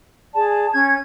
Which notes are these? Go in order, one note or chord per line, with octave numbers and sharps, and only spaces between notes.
G#4 D5 A5
C#4 G#6